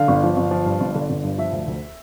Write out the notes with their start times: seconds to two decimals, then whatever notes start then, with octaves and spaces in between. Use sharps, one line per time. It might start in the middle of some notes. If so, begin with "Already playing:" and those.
Already playing: D3 F5
0.08 G1
0.23 F3
0.37 G1
0.51 F3
0.66 G2
0.80 G1
0.95 D3
1.10 G1
1.23 G2
1.38 F3 E5
1.53 D2
1.68 D2